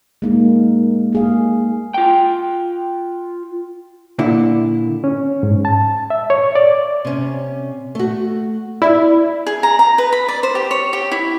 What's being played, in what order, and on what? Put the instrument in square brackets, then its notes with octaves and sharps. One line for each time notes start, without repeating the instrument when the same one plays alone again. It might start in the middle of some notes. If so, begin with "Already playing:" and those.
[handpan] G#3 A#3 D#4
A#3 G#4 F5
[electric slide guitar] F4 G5
[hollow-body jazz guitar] A#2 D3 E4
[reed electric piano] C#4
G#2
A5
E5
C#5
D5
[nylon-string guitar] C3 C#4
A3 F#4
[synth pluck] E4 [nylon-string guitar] D5 E5
[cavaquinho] G#4
A#5
A#5
B4
B5
D5
C5
G4
C#5
G4
E4